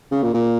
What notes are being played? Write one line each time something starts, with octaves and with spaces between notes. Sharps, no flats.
C#3
A#2
A#2